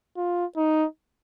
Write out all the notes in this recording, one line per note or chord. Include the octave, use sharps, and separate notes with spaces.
F4
D#4